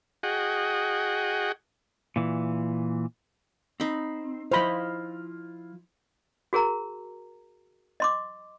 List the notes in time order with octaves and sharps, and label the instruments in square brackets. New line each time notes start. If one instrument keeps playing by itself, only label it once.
[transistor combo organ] F#4 G#4 D#5 F#5 G5
[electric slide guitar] A#2 E3
[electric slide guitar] C4 [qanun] D#4 B5
[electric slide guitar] F3 E4 F4 [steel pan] C5 B5 [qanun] D#5 F5
[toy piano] F#4 G#4 A#4 A#5
D#5 C6 D6